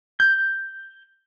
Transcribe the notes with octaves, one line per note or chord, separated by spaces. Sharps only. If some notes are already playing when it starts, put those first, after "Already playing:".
G6